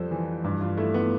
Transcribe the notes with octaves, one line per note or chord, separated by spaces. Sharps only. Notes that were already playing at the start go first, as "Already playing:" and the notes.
Already playing: F2 G3 A4 C5
E3
G2
F4
A3 E4
B3